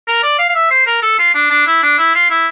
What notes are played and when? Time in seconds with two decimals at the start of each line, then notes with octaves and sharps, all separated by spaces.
0.07 A#4
0.23 D5
0.39 F5
0.49 F5
0.55 E5
0.70 C5
0.87 A#4
1.02 A4
1.19 F4
1.34 D4
1.51 D4
1.67 E4
1.82 D4
1.98 E4
2.15 F4
2.30 E4